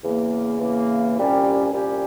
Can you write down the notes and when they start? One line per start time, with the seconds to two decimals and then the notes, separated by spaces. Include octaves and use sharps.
0.04 E2 C#3 E3 A#3
0.60 E2 C#3 E3 A#3
1.17 C2 A#2 G3 C#4 G4
1.73 C2 A#2 G3 C#4 G4